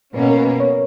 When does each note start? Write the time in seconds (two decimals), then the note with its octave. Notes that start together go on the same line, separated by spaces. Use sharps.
0.14 B2 A#3 C#4 B4
0.30 A#4
0.37 B4
0.60 C#5